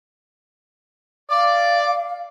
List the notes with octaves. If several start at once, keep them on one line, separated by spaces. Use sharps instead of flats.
D5 F5 D6